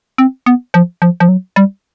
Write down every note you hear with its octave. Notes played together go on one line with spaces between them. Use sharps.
C4
B3
F3
F3
F3
F#3
G3